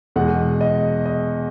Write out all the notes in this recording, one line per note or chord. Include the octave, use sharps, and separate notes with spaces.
E2 B2 G#3 F#5
D#5
D#5